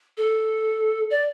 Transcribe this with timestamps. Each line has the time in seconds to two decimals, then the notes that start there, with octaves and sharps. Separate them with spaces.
0.17 A4
1.10 D5